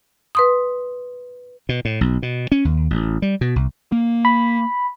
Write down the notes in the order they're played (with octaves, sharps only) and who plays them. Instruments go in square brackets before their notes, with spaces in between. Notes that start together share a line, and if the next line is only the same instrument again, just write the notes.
[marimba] B4 C6 D#6
[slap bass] B2
A2
B1
B2
C#4
D#2
A1
G3
B2
C2
[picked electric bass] A#3
[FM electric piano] B5